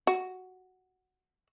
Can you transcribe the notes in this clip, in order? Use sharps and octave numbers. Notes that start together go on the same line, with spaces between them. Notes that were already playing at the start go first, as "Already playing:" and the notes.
F#4